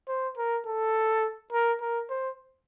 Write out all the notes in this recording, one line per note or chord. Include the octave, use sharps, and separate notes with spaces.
C5
A#4
A4
A#4
A#4
C5